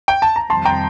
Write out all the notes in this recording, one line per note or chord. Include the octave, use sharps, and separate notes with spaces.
G5
A5
A#5
F2 C3 D#3 G3 A5 C6
G5 A#5